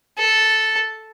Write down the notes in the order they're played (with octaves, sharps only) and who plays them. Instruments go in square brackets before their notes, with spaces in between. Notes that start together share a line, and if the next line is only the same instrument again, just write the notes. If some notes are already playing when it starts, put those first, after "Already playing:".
[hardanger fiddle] A4